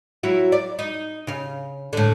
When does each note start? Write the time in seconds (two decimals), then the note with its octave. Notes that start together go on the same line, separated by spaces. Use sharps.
0.23 F#3 E4 F#4
0.52 D5
0.79 D#4
1.27 C#3 F5
1.93 A2 D3